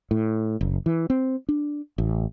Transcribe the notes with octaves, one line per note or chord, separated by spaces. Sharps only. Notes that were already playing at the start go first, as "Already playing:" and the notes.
A2
F#1
E3
C4
D4
A1